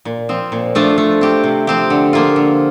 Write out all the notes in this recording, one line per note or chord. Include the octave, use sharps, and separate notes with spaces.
A#2
F3 C4
A#2
F3 A3 D4 F4
A3
C4 G4
C3
F3 C4 G4
D3
F3 A#3 F4
D3